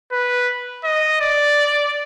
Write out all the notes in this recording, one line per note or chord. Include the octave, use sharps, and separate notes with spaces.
B4
D#5
D5